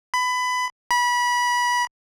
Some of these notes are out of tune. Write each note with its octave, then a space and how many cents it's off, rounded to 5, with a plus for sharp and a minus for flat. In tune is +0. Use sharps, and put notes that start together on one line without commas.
B5 +20
B5 -25